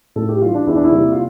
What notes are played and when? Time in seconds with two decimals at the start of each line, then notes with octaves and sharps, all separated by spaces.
0.16 A2 A4
0.29 G4
0.42 E3 G3 F4
0.54 D4
0.67 E2 E4
0.76 D4
0.84 E4
0.92 C3 G3 A#3
1.12 F4